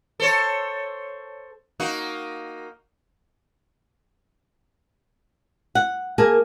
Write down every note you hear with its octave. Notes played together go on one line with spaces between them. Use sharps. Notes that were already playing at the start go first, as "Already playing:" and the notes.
A4 C5 C#5
A#3 D#4 F#4
F#5
A#3 G#4 A#4 G#5 A5